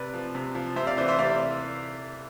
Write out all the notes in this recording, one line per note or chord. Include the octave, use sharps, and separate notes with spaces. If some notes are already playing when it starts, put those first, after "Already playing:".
Already playing: C3 B4 D5
F3
C3
F3
C3 C5 E5
D5 F5
E3 C5 E5
C5 E5
C3 D5 F5